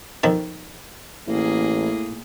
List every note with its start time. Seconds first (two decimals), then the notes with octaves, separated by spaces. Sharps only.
0.23 F2 D#3 A5
1.28 A1 A2 A#3 G#4